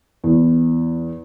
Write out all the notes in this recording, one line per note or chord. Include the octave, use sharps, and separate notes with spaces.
E2